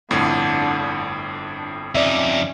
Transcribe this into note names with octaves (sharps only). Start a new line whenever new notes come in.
G1 F2 A2 D3
D4
F2 C#4 D#4 D5 E5